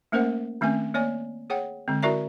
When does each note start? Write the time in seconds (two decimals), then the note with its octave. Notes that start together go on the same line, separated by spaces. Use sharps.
0.12 A3 A#3 C#4 A#4 C5 F#5
0.61 D#3 A3 C4 C#4 G#5
0.94 A#3 C#5 D5 G#5
1.50 G#4 C#5 F#5 G5
1.88 D3 G#3 C4
2.03 E4 F#4 A#4 D5 E5 A#5